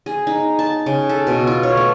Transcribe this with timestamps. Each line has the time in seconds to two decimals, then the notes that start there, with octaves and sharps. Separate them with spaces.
0.06 G#4
0.27 D#4
0.59 A5
0.86 C#3
1.09 A4
1.27 B2
1.47 F4
1.63 C#5
1.77 A3